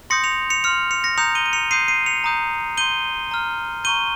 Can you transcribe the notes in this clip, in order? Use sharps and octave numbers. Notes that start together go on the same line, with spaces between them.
C6 D#6 G6 A#6 C#7
C#7 F7
C#7 F7
C6 F6 C#7 F7
C#7 F7
A#6 C#7
A#5 D#6 G6 C#7 F7
D#7 G7
D#7
C#7 F7
C6 D#6 G6 C7 D#7
C7 D#7
C#7 F7
A#5 D#6 G6
C6 G6 D#7 G7
A#5 F6
A#5 C#6 G6 D#7 G7